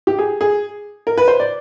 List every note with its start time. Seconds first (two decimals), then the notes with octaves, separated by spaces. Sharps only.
0.07 G4
0.19 G#4
0.41 G#4
1.07 A#4
1.18 B4
1.28 C5
1.40 D5